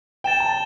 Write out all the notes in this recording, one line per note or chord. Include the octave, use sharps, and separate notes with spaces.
G5 A6 E7 G7
A5